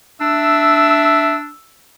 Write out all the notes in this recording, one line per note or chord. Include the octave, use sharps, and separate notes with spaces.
D4 E5 E6